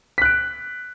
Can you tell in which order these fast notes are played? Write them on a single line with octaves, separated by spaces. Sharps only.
B6 F#6 D7